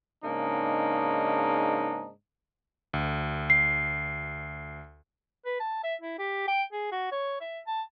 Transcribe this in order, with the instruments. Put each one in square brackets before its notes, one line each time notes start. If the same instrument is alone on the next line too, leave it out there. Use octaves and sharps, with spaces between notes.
[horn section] G#2 C#3 A#3 D4 D#4
[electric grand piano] D2
[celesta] C7
[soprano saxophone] B4
A5
E5
E4
G4
G5
G#4
F#4
C#5
E5
A5